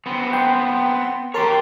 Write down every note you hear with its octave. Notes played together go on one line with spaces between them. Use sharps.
B3 C4
G5 C6
G4 A#4 C#5 A5 C6